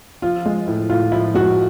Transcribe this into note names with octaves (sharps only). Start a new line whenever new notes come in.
F3 F4
G#3
A2
A2 F4
F3 E4
G#3 F#4